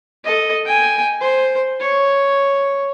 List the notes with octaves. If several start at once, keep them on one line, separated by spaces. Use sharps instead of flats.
A4 D#5
G5 G#5
C5
C#5